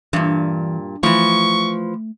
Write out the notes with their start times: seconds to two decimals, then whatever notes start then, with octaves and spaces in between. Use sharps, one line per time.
0.13 G2 A#2 E3
1.03 E3 F3 A3 C#6